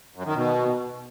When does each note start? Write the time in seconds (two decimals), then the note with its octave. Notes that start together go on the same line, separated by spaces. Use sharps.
0.16 F#2
0.25 D#3
0.35 B2